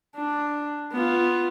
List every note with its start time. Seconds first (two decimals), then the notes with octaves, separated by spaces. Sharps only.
0.16 D4
0.92 B3 F4